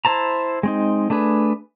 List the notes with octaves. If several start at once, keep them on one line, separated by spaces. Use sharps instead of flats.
E4 C5 A5 A#5
G#3 C4 D#4
A3 D4 G#4 B4